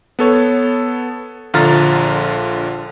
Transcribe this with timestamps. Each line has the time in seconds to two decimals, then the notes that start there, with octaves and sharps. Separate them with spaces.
0.19 B3 A4 C#5
1.54 A#1 D3 F4 A#5 F6 A6